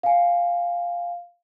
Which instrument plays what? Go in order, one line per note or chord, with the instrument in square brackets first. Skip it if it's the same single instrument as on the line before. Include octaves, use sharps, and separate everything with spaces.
[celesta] F5 G#5